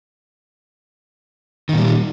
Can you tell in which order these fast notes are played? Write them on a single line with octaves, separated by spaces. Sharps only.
D#3 A#2 G3